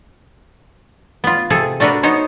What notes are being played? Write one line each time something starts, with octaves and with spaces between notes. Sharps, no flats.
B3 F4
C3 G#4 A4
A3 D4 F#4 A#4 B4
B3 D#4 C5 C#5